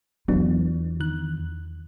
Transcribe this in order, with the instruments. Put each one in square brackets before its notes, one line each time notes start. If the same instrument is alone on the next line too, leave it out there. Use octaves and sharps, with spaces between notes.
[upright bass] E2 F4 [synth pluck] F#3 B3 D4
[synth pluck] D#3 F#6